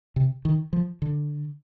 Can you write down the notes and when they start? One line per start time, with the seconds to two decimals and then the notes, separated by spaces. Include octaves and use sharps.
0.16 C3
0.45 D#3
0.73 F3
1.02 D3